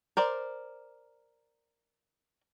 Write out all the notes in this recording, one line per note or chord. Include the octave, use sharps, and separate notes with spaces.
A#4 C5 D5